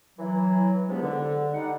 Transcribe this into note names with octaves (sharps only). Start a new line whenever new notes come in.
E3 F#3
E2 C3 F3 G#3 B3 D4
D3
G3 D#4 F#5